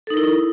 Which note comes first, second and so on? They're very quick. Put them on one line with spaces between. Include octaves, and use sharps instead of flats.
A4 D#4 A#4 E4